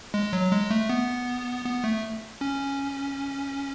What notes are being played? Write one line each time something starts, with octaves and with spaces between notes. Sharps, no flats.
G#3
F#3
G#3
A3
B3
B3
A3
C#4